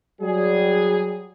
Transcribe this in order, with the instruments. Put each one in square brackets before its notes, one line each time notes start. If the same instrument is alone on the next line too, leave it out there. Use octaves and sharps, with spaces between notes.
[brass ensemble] F#3 G3 G#4